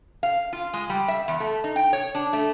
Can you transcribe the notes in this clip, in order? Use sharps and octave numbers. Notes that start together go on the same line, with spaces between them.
F5
F4
G#3
G3
E5
E2
A3
D#4
G5
C#5
D4
A3